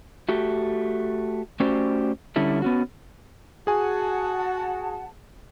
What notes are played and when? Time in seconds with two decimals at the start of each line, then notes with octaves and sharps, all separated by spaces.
0.29 A3 F#4 G4
1.60 A3 C#4 F#4 G4 C5 D5
2.36 D3 G3 C#4 E4 A4
2.62 B3 C#4 F#4
3.67 F#4 G#4 F#5 G#5 A5